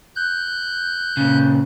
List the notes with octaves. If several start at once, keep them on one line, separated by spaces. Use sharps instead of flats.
F#6 G6
A#2 C#3